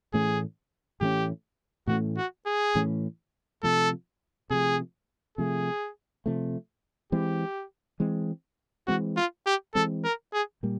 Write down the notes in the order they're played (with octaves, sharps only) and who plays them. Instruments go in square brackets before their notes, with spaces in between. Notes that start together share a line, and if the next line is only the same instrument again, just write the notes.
[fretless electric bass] A2 E3 A3 C#4 [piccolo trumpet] G#4
[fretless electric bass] A2 E3 A3 C#4 [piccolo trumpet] G4
[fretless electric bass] A2 E3 A3 C#4 [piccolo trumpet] F#4
[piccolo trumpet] F#4
G#4
[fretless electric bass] A2 E3 A3 C#4
[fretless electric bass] C3 F3 A3 [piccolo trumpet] A4
[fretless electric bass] C3 F3 A3 [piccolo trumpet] G#4
[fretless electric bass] C3 F3 A3 [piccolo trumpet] G#4
[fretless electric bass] C3 F3 A3
[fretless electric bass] E3 G#3 C4 [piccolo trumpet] G4
[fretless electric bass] E3 G#3 C4
[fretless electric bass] E3 G#3 C4 [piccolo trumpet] F#4
[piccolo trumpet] F4
G4
[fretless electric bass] E3 G#3 C4 [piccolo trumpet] A4
[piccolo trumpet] A#4
G#4
[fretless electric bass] A#2 G3 A#3